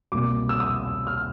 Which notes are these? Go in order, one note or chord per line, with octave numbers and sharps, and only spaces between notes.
C2 B2 G3 A#3 D6
E6
D#6
F6